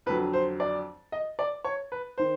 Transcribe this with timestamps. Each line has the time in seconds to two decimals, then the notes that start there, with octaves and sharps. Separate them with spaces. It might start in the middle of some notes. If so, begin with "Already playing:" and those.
0.06 F2 D3 F#3 B4
0.33 C5
0.60 D5
1.12 D#5
1.39 D5
1.65 C#5
1.92 B4
2.18 D#3 C5